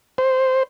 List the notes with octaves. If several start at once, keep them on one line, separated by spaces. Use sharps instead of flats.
C5